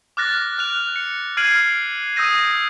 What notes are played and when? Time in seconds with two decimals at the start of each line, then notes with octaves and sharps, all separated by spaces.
0.17 D6 F6 F#6 A6 A#6
0.58 F6 F#6 F7
0.96 C#7
1.37 F6 G#6 C7 D7 D#7 F#7
2.16 D#6 E6 G6 A#6 D#7